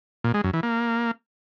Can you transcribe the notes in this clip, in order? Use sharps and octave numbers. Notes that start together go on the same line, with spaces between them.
A#2
G#3
F#2
E3
A#3